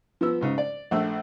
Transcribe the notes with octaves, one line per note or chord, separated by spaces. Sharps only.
F3 B3 E6
G#2 C#3
D5
A#1 A3 E6